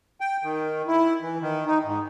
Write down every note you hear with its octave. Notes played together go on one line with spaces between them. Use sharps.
G5
D#3
E4
E3
D#3
D#4
G#2